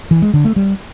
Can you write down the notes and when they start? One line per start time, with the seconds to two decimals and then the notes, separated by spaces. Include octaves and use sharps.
0.11 E3
0.22 G#3
0.34 D3
0.45 A3
0.56 G3